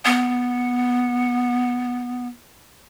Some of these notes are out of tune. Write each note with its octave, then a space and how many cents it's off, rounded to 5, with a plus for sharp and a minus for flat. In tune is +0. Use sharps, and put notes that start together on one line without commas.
B3 -5